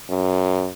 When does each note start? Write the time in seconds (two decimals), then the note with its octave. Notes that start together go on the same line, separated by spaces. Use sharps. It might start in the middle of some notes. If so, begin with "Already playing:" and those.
0.10 F#2